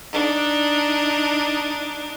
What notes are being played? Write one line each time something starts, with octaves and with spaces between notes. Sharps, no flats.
D4 D#4